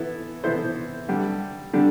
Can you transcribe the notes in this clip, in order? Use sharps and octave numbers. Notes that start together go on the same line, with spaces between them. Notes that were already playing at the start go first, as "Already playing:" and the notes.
Already playing: E3 B3 E4 A4
E3 B3 E4 A4 C5
D3 G3 D4
D3 G3 D4